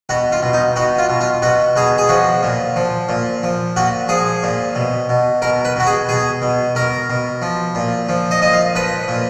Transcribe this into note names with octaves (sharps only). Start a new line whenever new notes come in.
B2 F#4
F4
B2
D#4
B2 F#4
F4
B2
F4
B2 F#4
B2 G#4
G#4
F3 F#4
A#2
F3
A#2
F3
A#2 F#4
F3 G#4
A#2
B2
B2
B2 A#4
B4
B2 F#4
G#4
B2 G#4
B2
B2 A#4
B2
F3
A#2
F3
D#5
A#2 D#5
F5
F3 B4
A#2